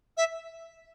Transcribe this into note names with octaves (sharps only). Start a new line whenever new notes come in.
E5